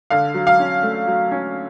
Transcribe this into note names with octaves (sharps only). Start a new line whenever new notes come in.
D3 F5
F#3
F5
C#4
A3
F#3
C#4